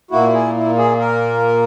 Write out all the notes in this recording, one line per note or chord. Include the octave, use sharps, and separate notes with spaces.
A#2 A#3 E4 F#4
G#4
E4
G#4
A#4